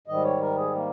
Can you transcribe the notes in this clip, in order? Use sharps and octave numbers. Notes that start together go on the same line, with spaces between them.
G#2 D#3 G3 D#5
C#5
A#4
G#4
A#3